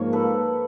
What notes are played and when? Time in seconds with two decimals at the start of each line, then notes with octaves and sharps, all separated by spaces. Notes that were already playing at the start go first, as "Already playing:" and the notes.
Already playing: G#2 F3 A#3 C#5
0.13 A4 B4